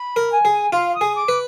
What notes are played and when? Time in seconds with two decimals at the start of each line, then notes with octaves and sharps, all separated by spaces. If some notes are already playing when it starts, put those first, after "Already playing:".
Already playing: B5
0.16 A#4
0.31 G#5
0.45 G#4
0.72 F4 F5
0.94 D#6
1.01 G#4
1.15 D6
1.28 B4